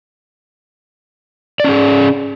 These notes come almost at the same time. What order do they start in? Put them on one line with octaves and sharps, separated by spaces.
D5 C#4 G#4